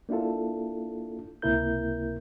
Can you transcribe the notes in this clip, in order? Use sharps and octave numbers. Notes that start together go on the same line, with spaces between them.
A#3 D4 E4 F4 A4
C#2 C3 A#3 E4 A#4 G6